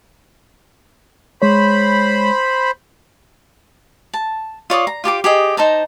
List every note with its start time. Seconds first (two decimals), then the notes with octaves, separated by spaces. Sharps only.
1.42 G#3 C5 C#5 B5
4.14 A5
4.70 F4 C#5 D5 D#6
4.87 A#5
5.04 F4 G4 A5 D6
5.24 G4 G#4 D#5
5.57 D#4 C5 A5 A#5